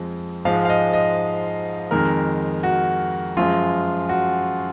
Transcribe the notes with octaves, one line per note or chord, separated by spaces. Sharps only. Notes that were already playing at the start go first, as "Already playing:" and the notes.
Already playing: F2 F3 G#3
G#2 F3 G#3 F5
F5
D#5
D#5
F2 D#3 G#3 A#4
F#4
F#2 F3 G#3 F4
F#4